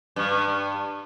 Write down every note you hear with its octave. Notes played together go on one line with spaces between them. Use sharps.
G2